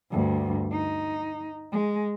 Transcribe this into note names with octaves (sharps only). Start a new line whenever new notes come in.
D2 G2
D#4
G#3